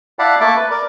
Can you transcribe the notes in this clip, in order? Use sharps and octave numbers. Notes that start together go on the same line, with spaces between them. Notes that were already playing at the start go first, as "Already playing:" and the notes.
E4 D5 F5 F#5 A5 B5
A3 A#3 A4 E5 A5 D6
B4
A#4 D5